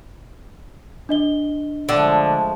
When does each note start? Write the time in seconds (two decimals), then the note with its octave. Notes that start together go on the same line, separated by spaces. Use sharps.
1.09 D4 D#5 G7
1.89 D3 F3 G#3 A3